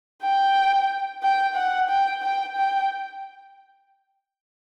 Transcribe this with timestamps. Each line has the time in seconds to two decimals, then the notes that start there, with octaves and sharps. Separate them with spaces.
0.22 G5
1.23 G5
1.56 F#5
1.89 G5
2.23 G5
2.56 G5